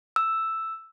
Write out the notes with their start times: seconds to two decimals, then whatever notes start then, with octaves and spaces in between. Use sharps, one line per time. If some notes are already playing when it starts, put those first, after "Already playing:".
0.16 E6